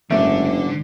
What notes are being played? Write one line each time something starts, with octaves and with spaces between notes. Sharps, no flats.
F#1 G#2 D3 A3